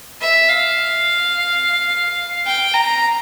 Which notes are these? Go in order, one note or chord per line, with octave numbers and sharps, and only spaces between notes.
E5
F5
G5
A#5